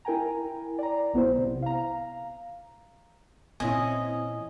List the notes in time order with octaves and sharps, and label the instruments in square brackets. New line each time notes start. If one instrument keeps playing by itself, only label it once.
[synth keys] E4 A#4 G5 G#5 A#5
D5 A#5
B1 B3 E4 C5
C3
F5 A#5
[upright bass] A#2 E3 [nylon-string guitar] C4 C#4 E4 [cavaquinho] D#5 [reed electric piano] G#5 D#6